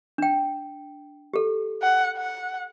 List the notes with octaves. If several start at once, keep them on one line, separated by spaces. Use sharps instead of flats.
D4 G5
G4 A4
F#5
F#5